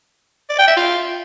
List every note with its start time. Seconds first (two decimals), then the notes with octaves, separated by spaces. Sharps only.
0.49 D5
0.58 G5
0.67 E5
0.76 F4